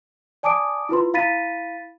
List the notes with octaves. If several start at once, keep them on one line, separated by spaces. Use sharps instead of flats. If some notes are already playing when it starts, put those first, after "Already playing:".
D5 G#5 A5 D6 D#6 D7
E4 F4 B4 C6
E4 F5 B5 A6 B6 D#7